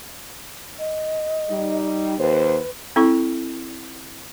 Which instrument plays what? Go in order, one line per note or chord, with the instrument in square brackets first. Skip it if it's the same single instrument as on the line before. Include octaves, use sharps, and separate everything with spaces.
[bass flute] D#5
[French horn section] G3 D#4
[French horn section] D#2 C5 [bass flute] B4
[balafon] C4 E4 A4 C#6